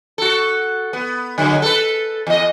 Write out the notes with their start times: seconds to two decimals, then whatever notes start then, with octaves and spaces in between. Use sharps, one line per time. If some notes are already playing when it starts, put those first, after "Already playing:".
0.18 F#4 A4
0.93 B3
1.38 D3 F#3 G#3
1.62 A4 B4
2.27 E2 D#5